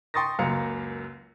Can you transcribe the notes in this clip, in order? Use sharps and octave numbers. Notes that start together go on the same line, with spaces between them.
G5 C6 C#6 D#6 A6 A#6
C#2 F#2 A#3 F5 A#5 C#7